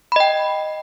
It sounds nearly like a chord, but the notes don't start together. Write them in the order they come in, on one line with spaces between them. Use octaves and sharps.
B5 D#5 G5